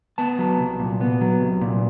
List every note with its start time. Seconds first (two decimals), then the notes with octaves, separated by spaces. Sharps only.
0.18 B3 A5
0.39 F#3
0.60 C2
0.80 A#2
1.01 B3
1.21 F#3
1.41 C2
1.61 A#2